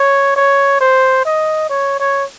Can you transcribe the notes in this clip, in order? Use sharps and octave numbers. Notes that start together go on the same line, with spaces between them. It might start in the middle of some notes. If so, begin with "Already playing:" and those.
Already playing: C#5
C#5
C5
D#5
C#5
C#5